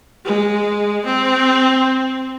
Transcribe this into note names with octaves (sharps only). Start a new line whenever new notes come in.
G#3
C4